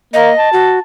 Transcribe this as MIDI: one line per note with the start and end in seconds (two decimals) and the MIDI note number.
0.13 0.30 58
0.13 0.49 75
0.38 0.81 81
0.53 0.79 66